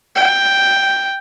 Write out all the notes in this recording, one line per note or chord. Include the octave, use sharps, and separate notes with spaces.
G5